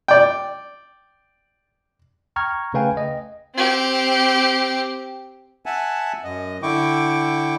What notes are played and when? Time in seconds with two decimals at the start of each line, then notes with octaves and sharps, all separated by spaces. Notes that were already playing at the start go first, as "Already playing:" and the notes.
0.08 D5 G5
2.36 G5 A#5 C#6 F6 G#6
2.74 C#3 A3 B4 F5 G5 G#5
2.97 D#5
3.55 C4 G4
5.66 E5 F#5 G#5 A5
6.24 F#2 D#5
6.62 D3 E4 G5 C#6 D6